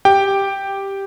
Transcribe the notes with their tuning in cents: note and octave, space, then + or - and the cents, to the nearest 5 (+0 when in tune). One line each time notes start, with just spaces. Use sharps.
G4 +0 G5 +5